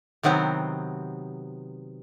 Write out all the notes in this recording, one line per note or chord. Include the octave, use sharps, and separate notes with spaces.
C3 D#3 F#3 B3 C4